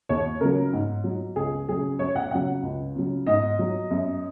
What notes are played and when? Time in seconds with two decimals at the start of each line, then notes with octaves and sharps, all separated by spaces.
0.09 D#2 C#5
0.40 C#3 F#3 A#4
0.73 G#2
1.04 F#3
1.36 C#2 G#4
1.69 C#3 F#3 G#4
1.99 F#2 C#5
2.16 F#5
2.31 C#3 F#3 F#5
2.63 C#2
2.95 C#3 F#3
3.27 G#2 D#5
3.59 F#3
3.91 F#2